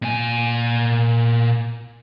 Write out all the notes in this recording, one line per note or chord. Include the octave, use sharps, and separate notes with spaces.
A#2 G#5